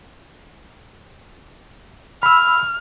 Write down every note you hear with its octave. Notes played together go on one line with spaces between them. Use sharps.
B5 E6 F6